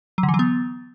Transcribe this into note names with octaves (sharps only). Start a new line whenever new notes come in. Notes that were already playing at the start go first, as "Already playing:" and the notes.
F#3
D3
E3
F#3
B3